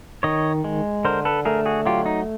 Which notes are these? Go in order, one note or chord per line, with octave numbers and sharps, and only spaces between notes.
D#3 C#5 D#5
G#3
D3 A#4 C5
A4 B4
A3 G#4 A#4
F#4 G#4
F#3 F4 G4
D#4